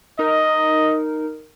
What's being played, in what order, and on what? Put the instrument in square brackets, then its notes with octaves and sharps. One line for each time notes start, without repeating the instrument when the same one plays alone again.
[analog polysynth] D#4 A#4 [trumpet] D#5